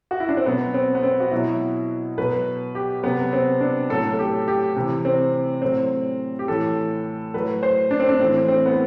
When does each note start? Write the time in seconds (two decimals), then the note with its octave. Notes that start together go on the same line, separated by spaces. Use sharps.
0.11 F#4
0.20 E4
0.29 D4
0.37 C4
0.46 B2 F#3 B3
0.74 C4
0.95 B3
1.03 C4
1.20 F#4
1.31 B2 F#3 E4
2.18 B2 F#3 B4
2.75 G4
3.03 C3 F#3 B3
3.33 C4
3.61 D4
3.90 A2 F#3 A4
4.13 A4
4.19 G4
4.48 G4
4.76 C3 E3
5.05 C4
5.62 A2 F#3 C4
6.39 G4
6.48 A2 E3 A4
7.34 A2 F#3 B4
7.63 C5
7.91 D4
8.00 C4
8.09 D4
8.19 A2 E3 C4
8.48 C4
8.66 B3